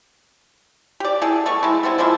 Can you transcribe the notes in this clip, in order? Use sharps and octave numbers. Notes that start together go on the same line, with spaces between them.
G4 D5
E4 G#4 A4
G3 A3 B3 C#6
G#3 E4
G3 B3 C4 E4
F3 G#3 A#3 E4